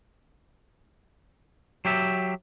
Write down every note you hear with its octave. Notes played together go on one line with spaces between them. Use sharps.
F#3 G4 E5